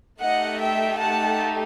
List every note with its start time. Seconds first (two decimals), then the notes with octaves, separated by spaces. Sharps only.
0.21 A3 D#4 G4 D#5 F#5
0.60 E5 G5
0.98 F#5 A5